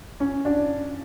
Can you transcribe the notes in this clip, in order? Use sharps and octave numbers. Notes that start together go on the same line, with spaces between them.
C#4
D4